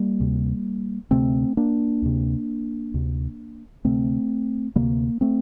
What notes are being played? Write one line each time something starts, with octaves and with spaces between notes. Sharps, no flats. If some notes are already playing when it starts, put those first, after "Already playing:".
Already playing: G3 A#3
D2 C3
D2 C3 A3 C4
A#3 D4
D2 C3
D2 C3
D2 C3 A3 C4
D2 C3 G3 A#3
A3 C4